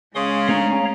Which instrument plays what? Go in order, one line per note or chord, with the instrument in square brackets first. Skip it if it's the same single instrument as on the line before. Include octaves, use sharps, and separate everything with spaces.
[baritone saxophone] C#3 [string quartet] G#3 C#4 [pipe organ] F5 C6 D#6
[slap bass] A3 C4 D4 [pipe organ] C#5 F5 A#5